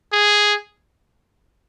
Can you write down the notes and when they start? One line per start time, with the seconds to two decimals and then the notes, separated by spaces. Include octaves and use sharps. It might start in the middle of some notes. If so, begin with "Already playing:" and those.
0.13 G#4